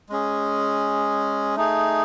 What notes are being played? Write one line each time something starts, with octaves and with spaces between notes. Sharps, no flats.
G#3 C#4 G#4
A3 D#4 G#4